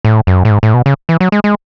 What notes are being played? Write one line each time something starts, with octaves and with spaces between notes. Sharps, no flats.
A2
F#2
A2
G#2
A2
B2
C#3
E3
F#3
G#3
G#3